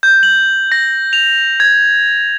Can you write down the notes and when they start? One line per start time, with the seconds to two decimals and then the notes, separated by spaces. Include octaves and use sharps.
0.03 G6
0.23 F#7
0.72 A#6
1.13 F7
1.60 G#6